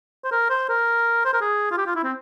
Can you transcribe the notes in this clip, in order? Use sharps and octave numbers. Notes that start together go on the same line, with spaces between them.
C5
A#4
C5
A#4
C5
A#4
G#4
F4
G4
F4
E4
C4